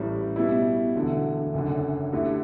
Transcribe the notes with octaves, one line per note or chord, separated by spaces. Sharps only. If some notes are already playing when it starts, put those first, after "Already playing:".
Already playing: A1 A2 G3
B2 G3 B3 E4
E1 D2 D3
F#1 F#2 D3
D2 D3 A3 E4 G4